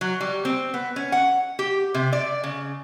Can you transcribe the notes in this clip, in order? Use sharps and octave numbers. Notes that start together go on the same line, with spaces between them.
F#3
G3
C4
B3
C#4
F#5
G4
C3
D5
C#3